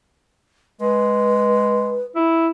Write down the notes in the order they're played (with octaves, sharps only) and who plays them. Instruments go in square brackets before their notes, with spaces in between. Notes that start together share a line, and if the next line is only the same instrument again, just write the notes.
[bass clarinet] G#3 [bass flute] B4
[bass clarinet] E4